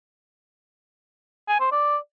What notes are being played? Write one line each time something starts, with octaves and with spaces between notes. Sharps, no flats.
G#5
C5
D5